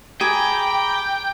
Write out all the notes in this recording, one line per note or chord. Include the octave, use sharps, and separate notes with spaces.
G#4 G5 A#5 B5 D6